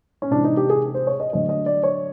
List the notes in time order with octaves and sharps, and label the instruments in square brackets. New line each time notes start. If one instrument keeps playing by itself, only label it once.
[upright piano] C#4
C3 E3 G#3 D4
D#4
G4
G#4
C5
C#5
D#5
D3 F#3 A3 D#5
D#5
D5
C#5